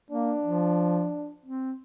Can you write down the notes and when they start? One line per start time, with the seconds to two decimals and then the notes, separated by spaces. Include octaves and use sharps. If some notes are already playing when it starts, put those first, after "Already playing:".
0.11 A#3 D4
0.43 F3
1.45 C4